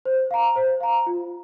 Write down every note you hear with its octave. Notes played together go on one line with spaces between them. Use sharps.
C5
F5 A#5
C5
F5 A#5
F4